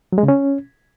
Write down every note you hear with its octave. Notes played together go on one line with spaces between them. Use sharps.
F#3
G#3
C#3
C#4